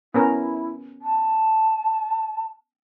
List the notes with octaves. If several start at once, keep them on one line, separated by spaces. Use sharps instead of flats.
B3 C#4 E4 A#4
A5